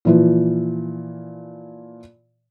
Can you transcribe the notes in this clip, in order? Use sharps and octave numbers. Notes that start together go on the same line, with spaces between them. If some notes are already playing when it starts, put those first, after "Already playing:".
A#2 E3 F3